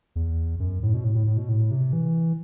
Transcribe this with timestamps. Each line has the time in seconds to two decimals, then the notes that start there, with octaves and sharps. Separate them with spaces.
0.16 E2
0.60 F#2
0.83 A2
0.94 B2
1.04 A2
1.15 A2
1.27 A2
1.37 B2
1.49 A2
1.71 C3
1.93 E3